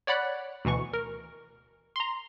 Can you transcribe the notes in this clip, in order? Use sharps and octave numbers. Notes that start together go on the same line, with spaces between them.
C#5 D5 F#5 B5 F#6
D2 B2 E3 C#6
A#4
A#5 C6